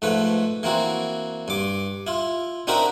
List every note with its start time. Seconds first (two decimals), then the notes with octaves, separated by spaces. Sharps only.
0.02 G#2 F3 A3 B4
0.63 E3 A#3 C4 F#4
1.48 G2 D6
2.07 E4 F4
2.67 C4 D4 D#4 F#4 A#4 E5